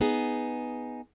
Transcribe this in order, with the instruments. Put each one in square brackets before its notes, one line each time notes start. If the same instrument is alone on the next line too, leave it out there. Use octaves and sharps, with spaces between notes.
[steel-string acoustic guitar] B3 D#4 G#4